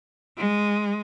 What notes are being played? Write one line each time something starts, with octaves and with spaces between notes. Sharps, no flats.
G#3